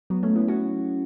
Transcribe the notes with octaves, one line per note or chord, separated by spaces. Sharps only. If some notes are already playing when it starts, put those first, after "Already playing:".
F#3 B3
A3 C#4
B3 E4
C#4 F#4